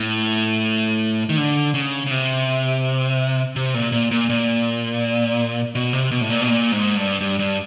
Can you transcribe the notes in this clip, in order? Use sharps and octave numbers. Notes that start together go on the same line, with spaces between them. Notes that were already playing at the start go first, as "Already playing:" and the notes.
Already playing: A2
D#3
D3
C#3
C#3
C3
C3
A#2
A#2
A#2
A#2
B2
C3
B2
A2
A#2
B2
A#2
G#2
G2
G2
G2